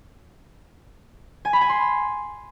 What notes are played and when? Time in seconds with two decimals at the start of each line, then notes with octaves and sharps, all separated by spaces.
1.45 G#5
1.53 B5
1.61 G#5
1.69 C6